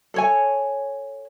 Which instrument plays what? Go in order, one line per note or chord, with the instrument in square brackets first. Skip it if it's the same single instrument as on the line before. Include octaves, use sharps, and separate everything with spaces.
[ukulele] A4 C#5 G#5